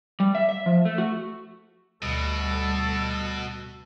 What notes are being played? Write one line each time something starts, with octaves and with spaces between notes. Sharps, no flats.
G3
E5
E5
F3
A3
F#4
D2 B2 G3 A4